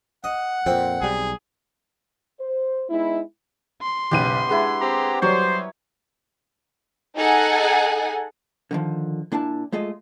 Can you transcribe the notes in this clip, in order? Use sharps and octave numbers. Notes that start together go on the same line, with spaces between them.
D#5 F#5
F2 A#2 C4
B1 G3 G#4
C5
G#3 B3 D#4 E4
C6
F#1 B1 B3 G4 D#7
G#3 B3 D4 E4
C4 G4 A#5
F#3 G3 C5 C#5
D#4 G#4 A4 F#5 G#5
D3 D#3 F3
A#2 D4 E4 A5
G#3 A3 F4 D#5